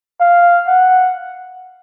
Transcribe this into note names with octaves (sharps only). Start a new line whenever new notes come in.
F5
F#5